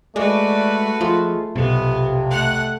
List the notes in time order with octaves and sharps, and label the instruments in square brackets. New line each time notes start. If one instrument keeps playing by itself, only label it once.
[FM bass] G#3 [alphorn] A3 [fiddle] F#4 B4 [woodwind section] D5 D6
[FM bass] F3 [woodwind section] G#3 F4
[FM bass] B1 [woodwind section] F2 C3 [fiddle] B3
[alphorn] A3 [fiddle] F#5 F#6